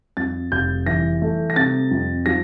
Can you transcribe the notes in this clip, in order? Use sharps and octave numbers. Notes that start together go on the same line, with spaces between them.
F2 A6
F1 G6
E3 A#6
A3
A#6
C3 A6
F2
F3 A#6